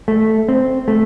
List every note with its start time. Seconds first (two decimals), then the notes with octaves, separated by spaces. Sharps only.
0.08 A3
0.49 C4
0.88 A3